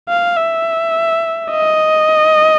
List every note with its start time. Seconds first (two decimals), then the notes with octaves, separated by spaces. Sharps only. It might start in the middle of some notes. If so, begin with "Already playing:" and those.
0.09 F5
0.37 E5
1.51 D#5